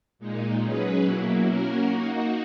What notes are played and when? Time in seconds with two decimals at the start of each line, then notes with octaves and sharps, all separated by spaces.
0.19 A#2 G#3 D#4
0.61 F#3 C#4 G#4 B4
1.04 B2 F#3 A#3 E4
1.47 A#3 C#4 F#4 A#4
1.89 A#3 D#4 F#4